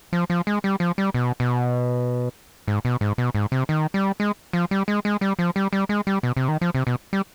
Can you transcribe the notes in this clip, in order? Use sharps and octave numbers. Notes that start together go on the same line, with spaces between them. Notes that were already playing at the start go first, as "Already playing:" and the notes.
F3
F3
G#3
G3
F3
G3
B2
B2
G#2
B2
G#2
B2
G#2
C3
D#3
G3
G#3
F3
G3
G#3
G#3
G3
F3
G3
G3
G#3
G3
B2
C3
D#3
F3
C3
B2
G3